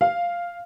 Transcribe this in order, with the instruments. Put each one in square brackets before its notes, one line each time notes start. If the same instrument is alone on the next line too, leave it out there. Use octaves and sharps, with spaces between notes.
[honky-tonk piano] F5